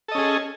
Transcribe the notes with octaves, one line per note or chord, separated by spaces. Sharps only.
C#4 G#4 A4 D#5